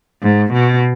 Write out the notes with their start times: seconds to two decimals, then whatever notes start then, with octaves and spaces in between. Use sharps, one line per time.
0.23 G#2
0.53 B2